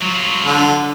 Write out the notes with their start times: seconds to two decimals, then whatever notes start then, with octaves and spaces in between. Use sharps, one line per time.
0.01 F#3 F4
0.44 D3